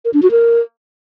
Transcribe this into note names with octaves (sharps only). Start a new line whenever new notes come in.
A#4
D4
F#4
A#4